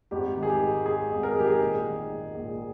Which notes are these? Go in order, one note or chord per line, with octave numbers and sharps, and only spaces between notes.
G#1 G4
D#3
G#4
G4
G#2
G#3 G#4
G#1
A#4
G#4
D#3 G4
G#4
A#1
D#3
G#2
A#1